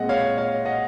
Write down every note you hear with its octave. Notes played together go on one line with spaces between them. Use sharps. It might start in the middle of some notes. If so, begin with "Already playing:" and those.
Already playing: A#2 G#3 C4 D#5 F#5
C#5 F5
C#5 F5
D#5 F#5